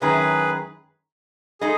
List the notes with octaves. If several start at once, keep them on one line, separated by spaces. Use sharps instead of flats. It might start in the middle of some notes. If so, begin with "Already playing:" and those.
F#2 D#3 G#3 C#4 E4 G#4 B4
G#3 D#4 G#4 A4 D#5